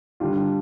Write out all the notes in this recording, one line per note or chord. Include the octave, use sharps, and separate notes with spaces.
D3 G3 D4 F4